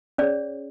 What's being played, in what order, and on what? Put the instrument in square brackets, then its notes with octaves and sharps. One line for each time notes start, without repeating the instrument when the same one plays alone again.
[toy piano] C#4 G#4 C#5 D5